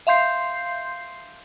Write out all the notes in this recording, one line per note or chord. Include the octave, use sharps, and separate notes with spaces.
E5 F5 C6 G6 C7